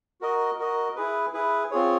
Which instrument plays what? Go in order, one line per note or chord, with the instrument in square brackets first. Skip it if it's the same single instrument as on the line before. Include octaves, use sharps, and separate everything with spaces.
[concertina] F#4 A#4 D#5
F#4 A#4 D#5
E4 G#4 B4
E4 G#4 B4
C4 F4 G#4 C#5